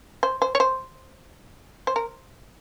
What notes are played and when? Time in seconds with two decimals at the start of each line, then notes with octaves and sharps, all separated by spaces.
0.23 C5
0.42 C5
0.55 C#5
0.60 C5
1.87 C5
1.96 A#4